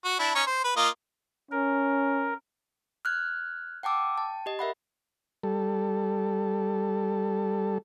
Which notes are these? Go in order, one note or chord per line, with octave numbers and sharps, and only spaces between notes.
F#4
D4 E4
C#4 D#4 C#5
C5
B4
A#3 F4 D#5
C#4 A#4
F6 F#6 G#6
F#5 G5 A5 D6 E6
G5 A5
G4 D#5
A#4 E5 F#5 B5
G3 A4